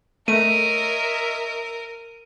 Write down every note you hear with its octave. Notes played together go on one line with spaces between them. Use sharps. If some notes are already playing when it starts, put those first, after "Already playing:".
A3 A#4 C#5 D#5 E5 D#7